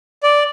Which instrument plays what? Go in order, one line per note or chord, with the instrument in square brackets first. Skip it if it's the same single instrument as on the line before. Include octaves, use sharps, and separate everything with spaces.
[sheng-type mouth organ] D5